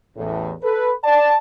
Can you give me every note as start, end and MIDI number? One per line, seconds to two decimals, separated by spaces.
0.17 0.52 33
0.17 0.52 40
0.17 0.52 45
0.63 0.92 69
0.63 0.92 71
1.04 1.35 74
1.04 1.35 81